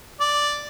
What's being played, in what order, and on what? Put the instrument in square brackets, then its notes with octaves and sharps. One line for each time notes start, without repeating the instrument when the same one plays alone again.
[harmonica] D5